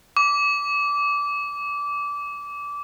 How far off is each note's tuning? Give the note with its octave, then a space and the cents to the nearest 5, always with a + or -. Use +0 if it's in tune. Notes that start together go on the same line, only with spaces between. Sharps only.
D6 -20